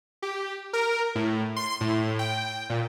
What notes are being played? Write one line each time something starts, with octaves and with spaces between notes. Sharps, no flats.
G4
A#4
A2
C6
A2
G5
A#2